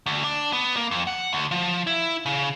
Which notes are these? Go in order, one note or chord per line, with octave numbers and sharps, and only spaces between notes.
D2
D4
B3
A#3
F2
F#5
D2
F3
E4
C#3